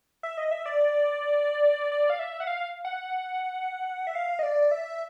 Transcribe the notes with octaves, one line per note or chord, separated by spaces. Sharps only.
E5
D#5
E5
D5
D5
F5
E5
F#5
F5
F#5
E5
F5
D#5
D5
E5